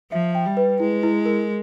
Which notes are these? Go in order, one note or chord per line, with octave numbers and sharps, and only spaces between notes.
F3 E5
G5
G3
B4
G#3 E4
E4
A#4